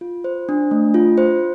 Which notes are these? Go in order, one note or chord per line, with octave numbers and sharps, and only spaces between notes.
F4
C5
D4
A3
F4
C5